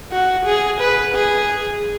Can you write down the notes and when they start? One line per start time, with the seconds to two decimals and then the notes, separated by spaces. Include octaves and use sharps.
0.12 F#4
0.46 G#4
0.81 B4
1.15 G#4